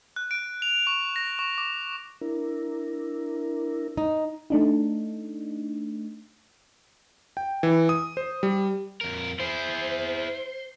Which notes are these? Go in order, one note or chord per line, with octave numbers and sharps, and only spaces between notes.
F#6
D7
F7
C#6
A#6
C#6
D6
D4 E4 A#4
D#4
A3 D4 D#4
G5
E3
D#6
C5
G3
F2 A#4
E4 G#4 C5